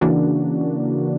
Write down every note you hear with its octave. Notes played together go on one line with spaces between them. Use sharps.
C#3 E3 A#3 D4 F#4